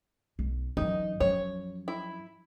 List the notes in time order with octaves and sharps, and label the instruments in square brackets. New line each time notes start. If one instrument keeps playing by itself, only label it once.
[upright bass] B1
[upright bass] F#2 E3 [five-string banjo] D#4
[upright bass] F#2 F3 [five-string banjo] C#5
[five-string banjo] E4